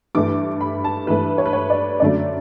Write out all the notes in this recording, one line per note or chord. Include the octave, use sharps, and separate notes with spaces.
G2 E3 A3 D6
B5
A5
G2 E3 A3 B4
C#5
B4
C#5
D5
F#2 D3 F#3 A3 D5